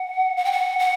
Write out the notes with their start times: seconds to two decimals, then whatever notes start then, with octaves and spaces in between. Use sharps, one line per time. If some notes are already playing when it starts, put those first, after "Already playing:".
Already playing: F#5
0.37 F#5
0.45 G5
0.52 F#5
0.79 F#5